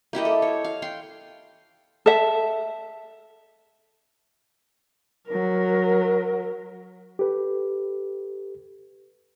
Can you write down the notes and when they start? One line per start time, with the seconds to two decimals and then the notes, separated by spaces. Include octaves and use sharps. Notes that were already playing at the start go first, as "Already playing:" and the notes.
0.13 A#3 E4 G4 D#5
0.25 A4
0.42 C#5
0.64 F5
0.82 G5 C6
2.06 A4 E5
5.28 F#3 A#4
7.19 G4 A4 B4